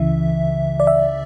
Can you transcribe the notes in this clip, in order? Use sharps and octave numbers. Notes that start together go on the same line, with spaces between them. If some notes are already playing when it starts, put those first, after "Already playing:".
Already playing: C#2 C#3 E3 E5
D5
E5